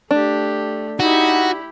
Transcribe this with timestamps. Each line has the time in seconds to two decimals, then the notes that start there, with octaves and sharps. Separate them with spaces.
0.11 A3 D4 G4
1.00 D#4 E4 F#4 G4